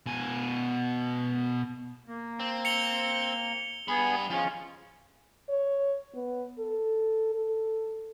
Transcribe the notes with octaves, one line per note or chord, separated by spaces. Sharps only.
B2 G#5
A#3
C4
C#7 F7 G7
G2 B3 G#4 B5
F3 G#3 C#4 F4
C#5
B3
A4
A4